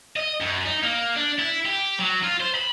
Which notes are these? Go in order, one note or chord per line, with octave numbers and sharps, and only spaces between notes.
D#5
F#2
D#4
A#3
D4
E4
G4
F#3
F4
C5
B5